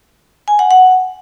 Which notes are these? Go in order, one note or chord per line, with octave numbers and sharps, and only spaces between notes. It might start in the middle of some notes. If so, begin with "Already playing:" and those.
G#5
F#5
F#5